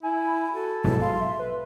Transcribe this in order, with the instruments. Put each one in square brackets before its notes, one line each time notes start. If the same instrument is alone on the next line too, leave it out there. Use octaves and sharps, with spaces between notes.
[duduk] E4 [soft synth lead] G#5 [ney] B5
[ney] F#4 [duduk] A4
[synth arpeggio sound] A#1 G#2 B2 [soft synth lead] F#3 [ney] E4
[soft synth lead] F5 [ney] C6
[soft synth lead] E5
B4